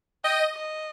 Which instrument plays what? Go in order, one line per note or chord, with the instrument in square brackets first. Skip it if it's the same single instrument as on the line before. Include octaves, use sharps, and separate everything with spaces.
[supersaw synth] D#5 [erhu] G5
[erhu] D#5